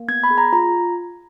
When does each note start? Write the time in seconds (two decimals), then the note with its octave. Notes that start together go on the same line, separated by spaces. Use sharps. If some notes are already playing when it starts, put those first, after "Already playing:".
Already playing: A#3
0.08 B3 G#6
0.24 B5
0.30 G#4
0.38 A#5
0.53 F4 A#5